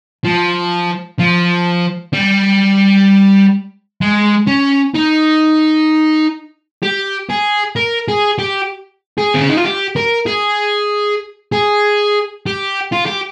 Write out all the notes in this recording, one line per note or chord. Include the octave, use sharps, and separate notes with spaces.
F3
F3
G3
G#3
C#4
D#4
G4
G#4
A#4
G#4
G4
G#4
C4
C#4
D#4
F4
G4
A#4
G#4
G#4
G4
F4
G4